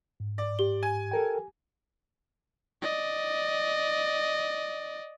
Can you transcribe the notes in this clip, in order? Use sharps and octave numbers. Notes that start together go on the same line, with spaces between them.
G#2
D5
G4 G7
G#5
A4 A#4 G5
G#5
D5 D#5